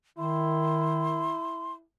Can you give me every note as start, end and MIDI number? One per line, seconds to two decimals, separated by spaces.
0.18 1.37 51
0.18 1.85 64
0.18 1.72 84